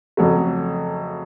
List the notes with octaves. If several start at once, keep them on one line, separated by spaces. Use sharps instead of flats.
F2 C#3 F#3 A3